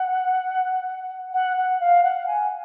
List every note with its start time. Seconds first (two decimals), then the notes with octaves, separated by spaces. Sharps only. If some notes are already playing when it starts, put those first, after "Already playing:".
Already playing: F#5
1.33 F#5
1.57 F#5
1.80 F5
2.04 F#5
2.27 G#5